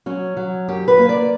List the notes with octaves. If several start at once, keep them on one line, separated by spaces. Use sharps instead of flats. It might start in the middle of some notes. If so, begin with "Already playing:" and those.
F#3 C#4
F#3
F#2 G4
B4
A#3
D5